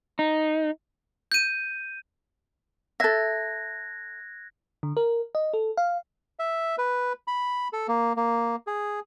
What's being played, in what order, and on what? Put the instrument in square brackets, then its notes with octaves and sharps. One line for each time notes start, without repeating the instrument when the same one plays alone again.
[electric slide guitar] D#4
[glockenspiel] G6 D#7
[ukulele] A4 E5 [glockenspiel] F#6 G#6 A#6
[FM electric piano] D3
A#4
D#5
A4
F5
[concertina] E5
B4
B5
A4
A#3
A#3
G#4